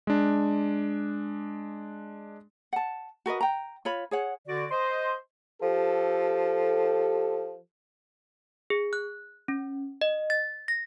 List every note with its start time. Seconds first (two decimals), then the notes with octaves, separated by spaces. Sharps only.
0.07 G#3 D4
2.73 F#5 A5
3.26 F#4 A#4 B4 D#5
3.41 G5 A#5
3.85 F4 C#5 B5
4.11 G#4 C#5 F#5
4.47 D3 F#4 D5
4.70 C5 D#5 C6
5.62 F3 G4 A4
8.70 G#4
8.93 F#6
9.48 C#4
10.01 D#5
10.30 A6
10.68 A#6